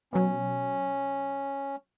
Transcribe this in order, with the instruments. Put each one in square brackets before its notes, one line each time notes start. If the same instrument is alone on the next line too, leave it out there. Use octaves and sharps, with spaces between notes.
[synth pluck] B2 F#3 [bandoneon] C#4